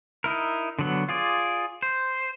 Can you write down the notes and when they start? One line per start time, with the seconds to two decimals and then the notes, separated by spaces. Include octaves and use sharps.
0.24 D#4 E4 A#4
0.79 D3 F#3 B3
1.09 F4 G#4 D5
1.82 C5